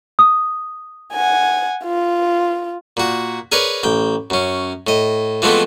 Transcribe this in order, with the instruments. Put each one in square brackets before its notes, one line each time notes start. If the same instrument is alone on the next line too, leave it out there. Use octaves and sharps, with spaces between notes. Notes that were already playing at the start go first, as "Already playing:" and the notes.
[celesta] D#6
[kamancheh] F#5 G#5
F4
[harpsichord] A#2 F#4
G#4 A#4 B4 C#5 D5
A1 G5
F#2 C#4
A2 D#5
E3 F3 G#3 A3 B3 C4